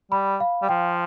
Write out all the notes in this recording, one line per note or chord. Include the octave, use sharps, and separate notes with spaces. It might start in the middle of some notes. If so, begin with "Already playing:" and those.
G3 B5
F5
G3
F3 G5